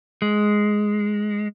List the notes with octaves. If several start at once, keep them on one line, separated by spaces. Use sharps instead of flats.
G#3